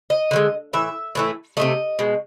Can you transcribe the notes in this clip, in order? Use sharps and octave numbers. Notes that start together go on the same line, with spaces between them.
D#5
D3 F3 G#3
A2 E3 E5
A2 E3 A3
C3 F3 A3 D#5
B2 G#3